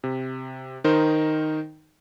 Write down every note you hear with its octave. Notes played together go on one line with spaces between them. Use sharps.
C3
D#3 D#4 A#4 C5